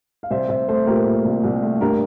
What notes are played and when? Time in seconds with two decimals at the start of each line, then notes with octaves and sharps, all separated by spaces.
0.23 F5
0.30 C2 C5 E5
0.49 C2 C5 E5
0.68 A3 A4 C5
0.86 A#2 G4 A#4
1.05 A#2
1.25 C2
1.44 C2
1.62 A3
1.80 G2 G4 A#4